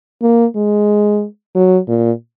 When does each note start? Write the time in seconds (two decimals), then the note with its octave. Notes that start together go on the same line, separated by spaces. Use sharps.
0.23 A#3
0.56 G#3
1.56 F#3
1.88 A#2